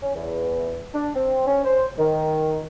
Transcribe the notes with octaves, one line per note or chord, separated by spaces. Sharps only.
C#4
E2
D4
C4
C#4
C5
D#3